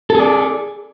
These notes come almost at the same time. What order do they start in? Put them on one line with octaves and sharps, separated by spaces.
A4 G#4 D5